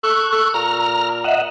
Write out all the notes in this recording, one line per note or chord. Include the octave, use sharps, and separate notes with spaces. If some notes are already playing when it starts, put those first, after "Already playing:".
A4 C#6 F#6
A4
A#2 A#5 F6
D#5 E5 F#5